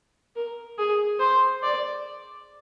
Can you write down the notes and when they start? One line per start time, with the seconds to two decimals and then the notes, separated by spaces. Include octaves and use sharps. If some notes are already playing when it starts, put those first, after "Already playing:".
0.36 A#4
0.78 G#4
1.20 C5
1.63 D5